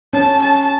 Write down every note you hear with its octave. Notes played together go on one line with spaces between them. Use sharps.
C#4 A5
A5